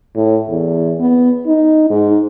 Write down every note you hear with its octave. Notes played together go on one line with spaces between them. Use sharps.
A2
E2
B3
D#4
G#2